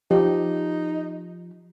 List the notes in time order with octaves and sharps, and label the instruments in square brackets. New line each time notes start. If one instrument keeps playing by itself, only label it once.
[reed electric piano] F3 [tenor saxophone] D#4 [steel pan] G4